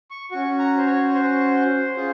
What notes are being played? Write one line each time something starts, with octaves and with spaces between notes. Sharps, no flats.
C#6
C#4 F#4 C#6
A#5
C5
C#5
C5
C#4 F4 G#4